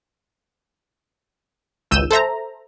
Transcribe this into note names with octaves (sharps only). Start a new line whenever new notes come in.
G#1 C#2 E6 G6 D#7 E7
A4 C5 E5 A#5